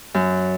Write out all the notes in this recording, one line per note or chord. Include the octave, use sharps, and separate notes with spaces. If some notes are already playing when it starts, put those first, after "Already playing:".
F#2